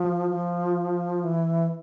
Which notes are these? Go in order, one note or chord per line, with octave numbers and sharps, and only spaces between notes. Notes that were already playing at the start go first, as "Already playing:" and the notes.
Already playing: F3
F3
E3